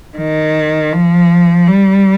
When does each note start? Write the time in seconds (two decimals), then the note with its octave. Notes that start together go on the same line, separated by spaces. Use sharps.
0.17 D#3
0.93 F3
1.68 G3